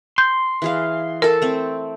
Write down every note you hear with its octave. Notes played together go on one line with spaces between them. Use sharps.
C6 G6
E3 G#4 F5
A4 A#4 A5
A3 C4